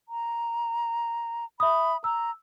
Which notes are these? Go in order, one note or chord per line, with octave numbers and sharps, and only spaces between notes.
A#5
E5 B5 D#6
A#5 E6